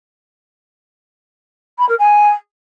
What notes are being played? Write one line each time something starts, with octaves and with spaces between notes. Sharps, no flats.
B5
A#4
G#5